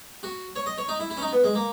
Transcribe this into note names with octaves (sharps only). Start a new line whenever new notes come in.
F#4
C#5
D#5
C#5
D#4
E4
E4
C#4
D#4
B3
G#3
A#3